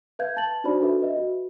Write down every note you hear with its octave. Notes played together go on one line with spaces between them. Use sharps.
B4 E5 F5 G6 G#6
A5 A6 F#7
D4 D#4 F#4 C5 D5 B5
D4 F#4 A4 B4 E5
B4 D#5 E5
F#4